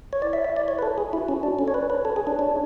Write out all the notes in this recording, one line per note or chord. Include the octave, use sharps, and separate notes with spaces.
C#5
E4 D5
E5
E5
D5
C#5
B4
A4
G#4
E4 F#4
C#4
D4
C#4 A4
C#5
B4 D5
B4 C#5
A4
G#4
D4
D4